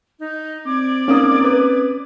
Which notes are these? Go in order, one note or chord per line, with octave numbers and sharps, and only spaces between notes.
D#4
C4 D5 D6 G#6
G#2 A#3 C#4 D#6
B4